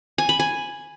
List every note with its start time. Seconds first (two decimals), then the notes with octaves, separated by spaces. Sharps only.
0.18 G#5
0.29 B5
0.39 G#5